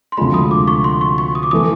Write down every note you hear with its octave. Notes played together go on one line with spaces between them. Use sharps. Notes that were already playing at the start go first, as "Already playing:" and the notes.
C6
D2 C3 F3 G#3 B5
D#6
D6
C#6
C6
C#6
C#6
D#6
D6
E3 A3 D#6